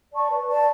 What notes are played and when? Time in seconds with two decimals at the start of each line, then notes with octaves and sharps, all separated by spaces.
0.12 D5 A5 C#6
0.30 B4
0.48 D5 A5